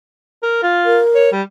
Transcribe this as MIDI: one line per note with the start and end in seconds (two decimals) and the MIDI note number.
0.42 0.61 70
0.63 1.00 65
0.85 1.29 70
1.15 1.29 73
1.32 1.42 55